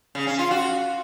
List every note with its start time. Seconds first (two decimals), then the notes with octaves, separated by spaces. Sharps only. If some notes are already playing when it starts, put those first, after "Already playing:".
0.15 C#3
0.27 C#4
0.39 F4
0.51 F#4